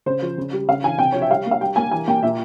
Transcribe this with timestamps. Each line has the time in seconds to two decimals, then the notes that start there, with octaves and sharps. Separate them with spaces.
0.06 C#3 C5
0.22 F3
0.38 C#3
0.53 G3
0.68 C#3 F5
0.83 E3 G#5
0.99 C3 G5
1.12 F3 C#5
1.22 E5
1.29 G3 F5
1.46 A#3
1.51 F5
1.61 G3 G5
1.76 A#3 G#5
1.91 E3 G#5
2.07 A#3 G5
2.22 A#2 E5